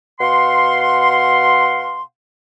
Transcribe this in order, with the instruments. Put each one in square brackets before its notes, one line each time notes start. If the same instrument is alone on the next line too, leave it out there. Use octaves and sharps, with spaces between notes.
[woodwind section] B2 F5 F#5 C6